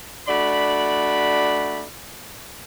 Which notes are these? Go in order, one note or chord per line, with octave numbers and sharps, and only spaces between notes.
A3 D4 F#4 D5 B5